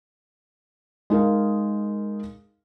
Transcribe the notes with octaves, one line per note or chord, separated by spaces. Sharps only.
G#3 D#4 A#4 F5